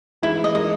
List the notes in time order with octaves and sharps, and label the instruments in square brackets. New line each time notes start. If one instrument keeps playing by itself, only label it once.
[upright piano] E3 G#3 D#4 [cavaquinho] E4
[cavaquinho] D#5
[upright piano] G#3 D#4 A#4 [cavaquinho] D#5